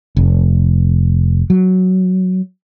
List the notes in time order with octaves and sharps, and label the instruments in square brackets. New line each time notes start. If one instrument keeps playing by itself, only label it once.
[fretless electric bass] F1
F#3